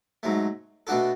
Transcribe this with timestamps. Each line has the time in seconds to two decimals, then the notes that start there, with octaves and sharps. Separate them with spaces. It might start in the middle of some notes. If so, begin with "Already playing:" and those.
0.23 G#2 F#3 A3
0.87 B2 A3 D4 F#4 A4